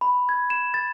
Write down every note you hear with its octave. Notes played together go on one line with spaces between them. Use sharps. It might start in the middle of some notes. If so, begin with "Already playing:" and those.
B5
G#6
E7
A6